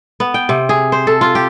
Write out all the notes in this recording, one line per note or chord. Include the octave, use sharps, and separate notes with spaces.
B3
G5
C3
G#4
C5
A4
F4
G4